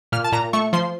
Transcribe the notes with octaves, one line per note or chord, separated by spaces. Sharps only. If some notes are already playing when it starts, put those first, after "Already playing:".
A#2 F6
A5
A#2 A#5
A3 C#6
F3 C6